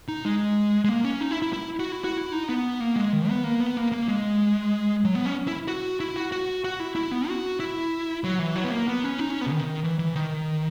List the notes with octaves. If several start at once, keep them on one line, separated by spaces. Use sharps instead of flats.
D#4
G#3
G#3
A#3
C#4
D#4
E4
E4
E4
F#4
E4
F#4
E4
D#4
B3
A#3
G#3
D#3
B3
A#3
B3
A#3
A#3
G#3
F#3
B3
C#4
E4
F#4
E4
F#4
F#4
F#4
E4
E4
B3
F#4
E4
F#3
E3
F#3
B3
A#3
B3
C#4
D#4
C#4
B3
C#3
D#3
E3
E3
D#3